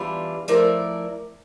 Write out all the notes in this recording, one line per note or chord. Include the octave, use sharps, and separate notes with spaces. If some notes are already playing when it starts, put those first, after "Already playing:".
Already playing: E2 E3 G3 D4 F4
F3 A3 E4 A#4 D5